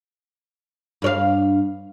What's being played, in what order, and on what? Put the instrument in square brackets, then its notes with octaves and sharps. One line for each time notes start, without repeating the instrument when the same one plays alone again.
[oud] G2 C#5 F5